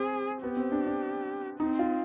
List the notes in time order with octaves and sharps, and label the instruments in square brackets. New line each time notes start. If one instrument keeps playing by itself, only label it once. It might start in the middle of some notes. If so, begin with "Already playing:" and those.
Already playing: [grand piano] C4 [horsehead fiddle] G#4
[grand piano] B3 [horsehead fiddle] G4
[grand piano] C4
D4
D4
[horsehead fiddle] C4 [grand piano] D#4
[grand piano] F4